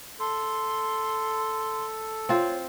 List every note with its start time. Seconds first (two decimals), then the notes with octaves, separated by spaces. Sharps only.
0.19 A4 C6
2.29 C4 F4 C#5